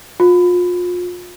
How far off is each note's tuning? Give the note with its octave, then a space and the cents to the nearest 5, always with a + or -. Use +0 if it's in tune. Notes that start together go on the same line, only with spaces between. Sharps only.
F4 +35